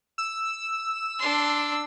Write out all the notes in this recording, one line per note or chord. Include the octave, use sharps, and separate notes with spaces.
E6
D4 C6